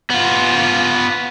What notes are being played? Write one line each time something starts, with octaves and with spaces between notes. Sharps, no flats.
B3 F4